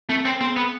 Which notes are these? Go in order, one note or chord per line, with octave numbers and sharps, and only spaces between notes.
A3 C4
C4
B3 C4
B3